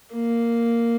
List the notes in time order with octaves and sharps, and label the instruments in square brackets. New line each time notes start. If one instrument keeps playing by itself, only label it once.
[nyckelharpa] A#3